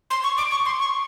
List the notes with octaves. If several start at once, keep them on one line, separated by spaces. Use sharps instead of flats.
C6
C#6
D6
C#6
C6
C#6